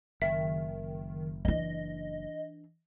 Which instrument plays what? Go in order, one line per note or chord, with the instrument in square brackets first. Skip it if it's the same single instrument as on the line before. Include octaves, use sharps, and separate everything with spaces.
[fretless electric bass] F#1 [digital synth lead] D#3 [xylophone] E5
[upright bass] E3 D4 [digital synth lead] D#5